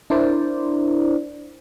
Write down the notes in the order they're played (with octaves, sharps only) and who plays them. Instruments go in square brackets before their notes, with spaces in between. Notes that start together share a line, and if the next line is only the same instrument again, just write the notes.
[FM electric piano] D4 E4 A#4 C5 D5